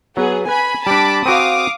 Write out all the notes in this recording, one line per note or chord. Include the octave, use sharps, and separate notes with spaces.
F#3 B3 G#4
B4 G#5 B5
G3 D4 A5 B5 D6
C4 F#4 F5 D6 D#6